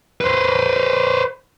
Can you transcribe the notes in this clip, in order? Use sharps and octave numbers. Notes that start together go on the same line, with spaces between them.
B4 C5